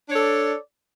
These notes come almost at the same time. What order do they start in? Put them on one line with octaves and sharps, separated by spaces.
D4 C#5 A4 D5